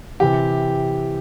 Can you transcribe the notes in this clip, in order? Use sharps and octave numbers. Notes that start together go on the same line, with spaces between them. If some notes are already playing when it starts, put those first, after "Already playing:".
C3 E3 G4